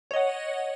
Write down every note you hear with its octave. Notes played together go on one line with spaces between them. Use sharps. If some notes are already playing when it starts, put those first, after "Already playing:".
C#5 D#5 F#5